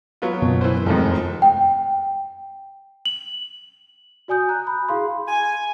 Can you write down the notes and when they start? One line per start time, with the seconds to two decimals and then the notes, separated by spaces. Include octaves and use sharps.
0.22 F#3 B3 F4
0.42 F#2 B2
0.61 E3 C5
0.86 F1 G#2 D#3 F3
1.42 G5
3.06 F#7
4.28 F#4 D5 G#5 D#6 G6
4.49 A#5 F#6
4.67 B5
4.88 E4 G#4 F5 C6
5.28 G#5